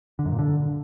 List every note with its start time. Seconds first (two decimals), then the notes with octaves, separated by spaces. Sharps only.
0.19 D3
0.26 F#2
0.32 A#2
0.39 D3